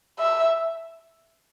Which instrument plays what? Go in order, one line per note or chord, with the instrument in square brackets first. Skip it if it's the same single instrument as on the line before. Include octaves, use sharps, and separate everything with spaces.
[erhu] E5